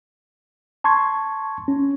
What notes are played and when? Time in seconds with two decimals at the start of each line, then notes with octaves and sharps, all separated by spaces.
0.84 A5 C6 C#6 G#6
1.68 C#4